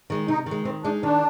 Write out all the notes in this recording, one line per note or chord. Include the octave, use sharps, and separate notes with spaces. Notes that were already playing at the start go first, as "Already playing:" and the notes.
D#3 G#3
C3 D#4
D#3 G#3
D#3 C4
G#3 D4 D#4
D#3 D4